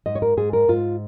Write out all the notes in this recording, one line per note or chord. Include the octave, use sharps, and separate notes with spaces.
G#2 D#5
C#5
A#4
G#2 G#4
A#4
G#2 F4